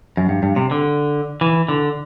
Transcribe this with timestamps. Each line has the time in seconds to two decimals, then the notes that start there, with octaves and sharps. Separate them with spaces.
0.17 F#2
0.29 G2
0.43 G2
0.56 C3
0.71 D3
1.41 E3
1.69 D3